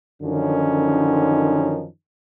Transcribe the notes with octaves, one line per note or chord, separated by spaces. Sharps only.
F#2 D3 D#3 F3 C#4 D#4